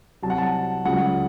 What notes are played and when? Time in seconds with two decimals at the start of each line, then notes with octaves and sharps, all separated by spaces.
0.23 C2 C3 F#3 A5
0.30 F#5
0.38 A5
0.85 C#2 C#3 F#3 F#5